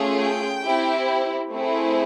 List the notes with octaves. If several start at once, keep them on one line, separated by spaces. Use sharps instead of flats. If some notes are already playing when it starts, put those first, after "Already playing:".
Already playing: A3 C#4 F4 G#4
G5
C4 E4 G4
A3 C4 E4 G#4